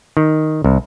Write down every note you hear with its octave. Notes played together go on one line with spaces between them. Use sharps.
D#3
C2